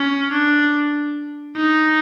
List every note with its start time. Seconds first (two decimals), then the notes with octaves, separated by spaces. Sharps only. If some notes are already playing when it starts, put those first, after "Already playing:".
Already playing: C#4
0.32 D4
1.57 D#4